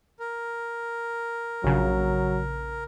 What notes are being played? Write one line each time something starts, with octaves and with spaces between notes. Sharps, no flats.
A#4
A#1 C#3 F#3